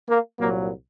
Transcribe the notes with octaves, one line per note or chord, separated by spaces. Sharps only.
A#3
C2 A#2 F#3 A#3